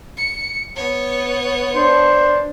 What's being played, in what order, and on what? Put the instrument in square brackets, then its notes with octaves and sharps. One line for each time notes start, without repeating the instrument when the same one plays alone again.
[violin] C#7
B3 C#5
[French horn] D4 [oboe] C5